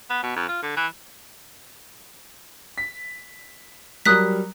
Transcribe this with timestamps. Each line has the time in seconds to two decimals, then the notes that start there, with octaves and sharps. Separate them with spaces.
0.10 B3
0.23 B2
0.36 F2
0.48 F4
0.63 D3
0.76 E3
2.78 B6
4.06 F#3 G3 A#4 D#6 F#6 B6